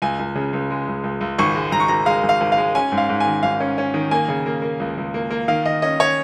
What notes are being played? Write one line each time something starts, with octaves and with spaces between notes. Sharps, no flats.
C#2 G#5
C#2
C#3
C#2
G#3
C#2
C#2
C#2
G#1 C#6
G#3
G#1 A#5
C#6
G#1 A#5
G#3 F5
G#1
F5
G#1
F5
G#3
C#4 G#5
G#2
F5
G#2
G#5
D#3
G#1 F5
C#4
C#4
D#3
A#3 G#5
C#3
A#3
A#3
C#2
C#2
A#3
A#3
D#3 F5
D#3 D#5
C#4 D#5
C#4 C#5